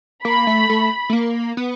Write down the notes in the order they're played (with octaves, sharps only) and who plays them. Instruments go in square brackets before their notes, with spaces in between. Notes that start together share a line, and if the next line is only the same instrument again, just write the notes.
[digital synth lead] A#3 [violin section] B5
[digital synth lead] A3
A3
A3
A#3
B3